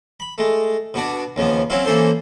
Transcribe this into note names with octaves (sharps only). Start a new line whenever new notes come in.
B5
G#3 A3
B2 B3 D4 F#4
D#2 C#3 F3 B3
F#3 C4 C#4 E4 F5
E3 A#3 C#4 A4 C5